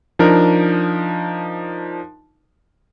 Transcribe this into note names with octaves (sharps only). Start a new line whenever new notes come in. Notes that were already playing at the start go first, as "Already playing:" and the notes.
F3 D4 D#4 A#4